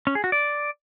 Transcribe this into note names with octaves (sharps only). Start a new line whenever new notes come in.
C#4
G#4
F#4
D5